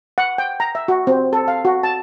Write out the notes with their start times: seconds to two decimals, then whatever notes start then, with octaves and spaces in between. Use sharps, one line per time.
0.18 F#5
0.38 G5
0.60 A#5
0.75 E5
0.88 F#4
1.07 C4
1.33 A4
1.48 F5
1.65 F#4
1.83 A5